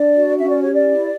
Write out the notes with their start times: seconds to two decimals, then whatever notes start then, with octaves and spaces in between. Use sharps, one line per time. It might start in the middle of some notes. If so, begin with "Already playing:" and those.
Already playing: D4 D5
0.16 F#4
0.38 C#4 E5
0.50 D5
0.61 G4 C#5
0.74 D5
0.84 E4